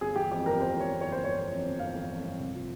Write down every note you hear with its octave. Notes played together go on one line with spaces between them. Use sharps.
G1 G#4
E3 G4
F2 G4
G1 A#4
G1 C5
E3 C#5
F2
G1 C#5
C5
G1 C#5
E3
F2
G1
G1 F5
E3
F2
G1
C2
F3